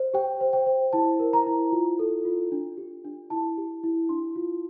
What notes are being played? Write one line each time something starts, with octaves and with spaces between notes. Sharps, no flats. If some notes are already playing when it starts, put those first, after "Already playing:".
Already playing: C5
G4 G5
C5
G5
C5
E4 A5
A#4
A#5
E4
F4
A4
F4
D4
G4
D4
E4 A5
G4
E4
D4 C6
F4